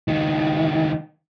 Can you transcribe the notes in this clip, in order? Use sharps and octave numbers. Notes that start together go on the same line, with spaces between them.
C#2 D#3